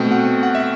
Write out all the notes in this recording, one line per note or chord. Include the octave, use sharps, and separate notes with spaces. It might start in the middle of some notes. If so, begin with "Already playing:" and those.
Already playing: B2 A3 C4 G5
F#5
F#5
E5